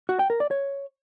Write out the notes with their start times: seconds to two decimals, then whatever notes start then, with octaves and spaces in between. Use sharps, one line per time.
0.09 F#4
0.19 G5
0.30 A#4
0.40 D5
0.51 C#5